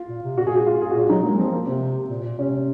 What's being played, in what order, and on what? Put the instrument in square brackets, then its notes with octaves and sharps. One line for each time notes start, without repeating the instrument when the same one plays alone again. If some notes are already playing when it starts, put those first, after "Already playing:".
Already playing: [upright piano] F4
[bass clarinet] A#2
C3
[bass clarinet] A#2 [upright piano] F#4
[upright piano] G#4
F#4
F4
G#4
F#4
[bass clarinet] A#2 [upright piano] F4
[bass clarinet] F#3 [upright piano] D#4
[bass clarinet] G#3 [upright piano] A#3
[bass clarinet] F3 [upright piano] C4
[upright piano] A#3
[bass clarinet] C3 [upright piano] C4
[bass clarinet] A#2
A#2
[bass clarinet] C3 [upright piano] C#4